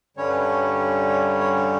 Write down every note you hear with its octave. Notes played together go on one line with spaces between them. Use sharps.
G2 D3 G3 C#4 C#5
B4
C#5
C#5
C#5